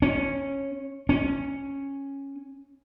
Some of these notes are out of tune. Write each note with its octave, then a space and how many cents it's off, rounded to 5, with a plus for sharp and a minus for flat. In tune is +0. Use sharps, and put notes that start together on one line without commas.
C#4 -10
C#4 -5